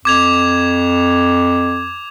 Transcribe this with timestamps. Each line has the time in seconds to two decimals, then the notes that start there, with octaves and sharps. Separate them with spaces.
0.05 F2 D6 G#6 F7